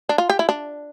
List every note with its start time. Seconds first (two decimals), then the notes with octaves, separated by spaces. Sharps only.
0.09 D4
0.18 F4
0.30 G4
0.39 E4
0.49 D4